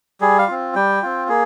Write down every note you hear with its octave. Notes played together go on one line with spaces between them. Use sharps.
G3 G#4
F5
C4 F4
G3 G5
C4 F4
A#3 G#4